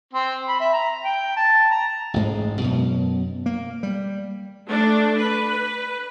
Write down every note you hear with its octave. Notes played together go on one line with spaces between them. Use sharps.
C4
B5
E5
A#5
G5
A5
A#5
A1 G#2 G#3
F#2 B2
A#3
G3
A3 D4
B4